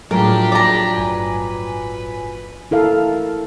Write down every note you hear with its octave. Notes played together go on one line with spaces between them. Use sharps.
A2 F3 F#3 D4 G4 G#4 A#4
D5 A#5
G1 G2 B4 G#5
E4 A4 A#4 F5